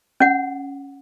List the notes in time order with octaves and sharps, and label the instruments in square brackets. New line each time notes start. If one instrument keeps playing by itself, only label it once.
[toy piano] C#4 F#5